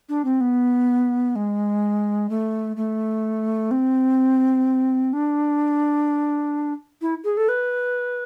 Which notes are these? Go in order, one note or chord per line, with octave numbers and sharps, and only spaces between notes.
D4
C4
B3
G#3
A3
A3
C4
D4
E4
G#4
A4
B4